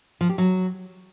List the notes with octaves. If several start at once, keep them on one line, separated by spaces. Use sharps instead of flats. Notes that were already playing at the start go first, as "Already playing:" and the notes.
F3
G4
F#3